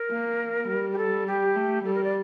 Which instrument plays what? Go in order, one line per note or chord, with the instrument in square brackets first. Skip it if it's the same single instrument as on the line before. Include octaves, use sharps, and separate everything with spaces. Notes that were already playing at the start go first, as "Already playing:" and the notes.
Already playing: [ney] A#4
[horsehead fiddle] A#3
G3
[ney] G4
A4
G4
[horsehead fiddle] A3
[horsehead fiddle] G3 [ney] A4
[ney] A#4
D5